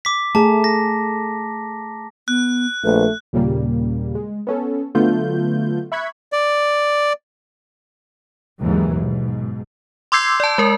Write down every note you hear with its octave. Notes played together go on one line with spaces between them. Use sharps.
D6 B6
A3 G#4 A5 A#5
A#6
B3 F#6
A#1 A3 B4
D#2 A#2 C#3 G3 A#3
G#3
B3 C#4 A4
D3 F#3 A3 B3 F4 G6
E5 B5 C#6 F#6 G#6 B6
D5
D#2 G#2 C#3 E3 F#3
G#2 B2
C6 D6 E6 G6 G#6 C7
D5 A5
G#3 A#4